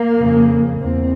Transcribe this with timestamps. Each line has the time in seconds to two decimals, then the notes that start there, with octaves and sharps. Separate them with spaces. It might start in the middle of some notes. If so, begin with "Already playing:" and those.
Already playing: A#3
0.17 F2 C#3
0.80 E2 C4